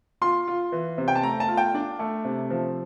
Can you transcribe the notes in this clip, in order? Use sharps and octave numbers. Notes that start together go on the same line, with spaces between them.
F4 C6
F4
E3
C3
G5
A5
A3 A#5
A5
F4
G5
D4
A3
C3
F3